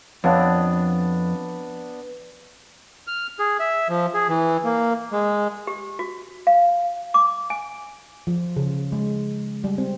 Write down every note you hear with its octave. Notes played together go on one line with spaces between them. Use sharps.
F2 B3 D4 C#5 F5 A5
F6
G#4
E5
F3
G#4
E3
A#3
G#3
G4
F#4
F5
D6
G#5
F3
C#3
G#3
G3
C4